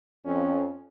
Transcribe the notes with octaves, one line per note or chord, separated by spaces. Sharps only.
F2 C#4